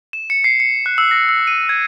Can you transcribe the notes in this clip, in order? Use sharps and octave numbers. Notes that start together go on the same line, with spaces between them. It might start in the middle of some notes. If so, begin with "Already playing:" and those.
E7
C#7
C7
C#7
F#6
E6
A#6
E6
D#7
G#6